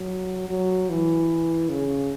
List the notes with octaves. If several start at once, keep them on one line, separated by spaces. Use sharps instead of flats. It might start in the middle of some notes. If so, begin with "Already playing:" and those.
Already playing: F#3
F#3
E3
C#3